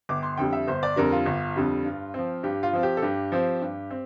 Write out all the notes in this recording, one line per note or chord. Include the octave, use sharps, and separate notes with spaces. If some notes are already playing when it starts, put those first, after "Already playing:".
G1 D6
C6
F2 D3 G3 G5
E5
G1 C5
D5
F2 D3 G3 A#4
F4
G1
F2 D3 G3
G2
F3 C4
G2 G4
F4
F3 C4
G4
A4
G2 G4
F3 C4
G2
C4